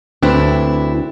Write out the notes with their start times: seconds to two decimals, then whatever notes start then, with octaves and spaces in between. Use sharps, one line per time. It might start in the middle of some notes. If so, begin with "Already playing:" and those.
0.23 D2 C4 D4 E4 B4